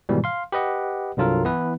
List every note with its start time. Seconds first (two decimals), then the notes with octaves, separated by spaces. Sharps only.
0.09 G#2 B2 D#3 E3 G3
0.24 F5 C6
0.52 G4 B4 D#5 F#5
1.17 C2 G2 F#3 F4 A4 A#4
1.44 E3 B3 E4 B4